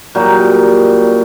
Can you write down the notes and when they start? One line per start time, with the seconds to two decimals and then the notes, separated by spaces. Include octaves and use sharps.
0.15 A#2 F#3 G3 D#4